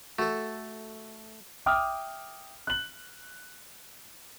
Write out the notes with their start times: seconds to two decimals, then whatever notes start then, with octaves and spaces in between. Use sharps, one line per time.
0.18 A3 F#4 A4
1.66 E5 G5 D6 D#6 F6
2.67 F#6 F#7